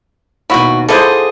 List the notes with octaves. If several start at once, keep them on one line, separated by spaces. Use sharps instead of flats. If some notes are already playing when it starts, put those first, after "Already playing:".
D#2 B2 E4 F#4
D3 F3 E4 G#4 A4 C5 D#5